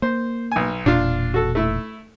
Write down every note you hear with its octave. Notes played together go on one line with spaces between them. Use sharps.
A#3 C5
B1 G#5
E1 A#2 D4 F4
F#4 A4
A3 E4